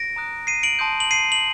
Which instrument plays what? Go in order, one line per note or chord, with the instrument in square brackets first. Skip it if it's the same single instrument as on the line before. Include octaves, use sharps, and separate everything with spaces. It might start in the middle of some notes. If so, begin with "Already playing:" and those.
Already playing: [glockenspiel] A#6 D7
A#5 D#6 F#6
C7 D#7
D7 F#7
A5 C6 D#6 G6
F#7
C7 D#7
F#7